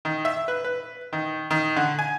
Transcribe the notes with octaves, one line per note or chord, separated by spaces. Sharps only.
D#3
E5
B4
B4
D#3
D#3
D3
G#5